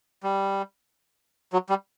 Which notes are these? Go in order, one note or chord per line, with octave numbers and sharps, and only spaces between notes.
G3
F#3
G3